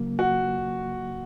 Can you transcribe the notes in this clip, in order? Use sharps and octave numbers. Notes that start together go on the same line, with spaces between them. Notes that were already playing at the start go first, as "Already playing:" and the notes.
Already playing: C#3 F#3 A#3
F#4